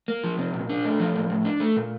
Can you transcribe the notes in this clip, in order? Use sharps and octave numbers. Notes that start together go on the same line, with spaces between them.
A#3
F3
C3
A#2
D4
A3
F3
A2
A2
D4
A3
A#2